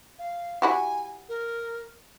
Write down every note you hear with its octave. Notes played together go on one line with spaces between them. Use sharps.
F5
E4 F#4 G4 G#5
A#4